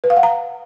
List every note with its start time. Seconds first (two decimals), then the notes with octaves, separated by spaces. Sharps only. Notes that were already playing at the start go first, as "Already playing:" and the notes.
0.04 B4
0.10 F5
0.17 F#5
0.23 A#5